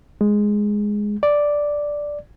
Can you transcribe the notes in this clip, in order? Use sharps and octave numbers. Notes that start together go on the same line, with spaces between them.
G#3
D5